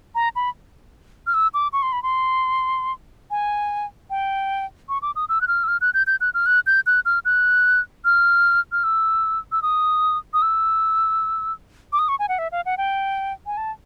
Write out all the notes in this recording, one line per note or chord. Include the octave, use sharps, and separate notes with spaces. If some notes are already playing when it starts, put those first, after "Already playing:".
A#5
B5
F6
E6
D6
C#6
C6
B5
C6
G#5
G5
C#6
D6
D#6
E6
F#6
F6
E6
F6
F#6
G6
G6
F#6
F6
F#6
G6
F#6
F6
F#6
F6
F6
E6
E6
D#6
D#6
E6
D6
D#6
C#6
G#5
F#5
E5
F5
F#5
G5
G#5
A5